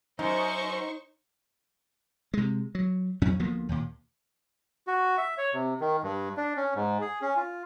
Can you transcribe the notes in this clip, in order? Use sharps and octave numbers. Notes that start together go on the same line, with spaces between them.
F#2 D#4 C5 C#6
C3 G#3
F#3
F2 F#3 C#4
D2 F3 A#3 B3
D#2 A#2
F#4
E5
C#5
C3
D#3
G2
D4
C#4
G#2
G#4
C#4
F4